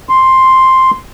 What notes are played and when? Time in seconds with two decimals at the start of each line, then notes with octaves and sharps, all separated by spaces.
0.09 C6